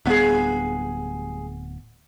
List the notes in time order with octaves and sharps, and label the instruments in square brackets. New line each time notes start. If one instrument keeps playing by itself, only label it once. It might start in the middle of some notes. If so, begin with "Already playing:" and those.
[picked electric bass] D1 B3 [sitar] G3 G#4